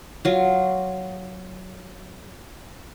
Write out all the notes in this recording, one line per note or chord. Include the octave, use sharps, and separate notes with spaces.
F#3 F4